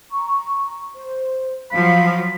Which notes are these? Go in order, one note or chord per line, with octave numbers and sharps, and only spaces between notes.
A#5 C#6
C5
F3 F#3 F5 B5